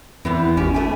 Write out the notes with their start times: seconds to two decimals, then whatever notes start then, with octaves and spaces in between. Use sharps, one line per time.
0.25 E2 E3 B3 C4
0.57 G#1 C#4 G4
0.74 A3 G#5